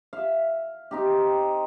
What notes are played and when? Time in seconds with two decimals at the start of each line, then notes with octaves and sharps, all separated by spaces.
0.13 E5 F5
0.91 C4 D#4 G4